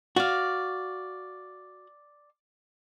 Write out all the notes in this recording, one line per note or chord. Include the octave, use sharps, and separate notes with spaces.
F#4 D5 F5